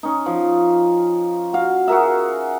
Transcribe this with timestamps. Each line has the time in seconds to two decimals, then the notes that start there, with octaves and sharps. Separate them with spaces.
0.03 C#4 D#4
0.26 F3
1.53 F#4 F5
1.88 F#4 G#4 A#4 E5